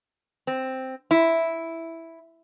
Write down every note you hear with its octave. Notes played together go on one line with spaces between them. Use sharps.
C4
E4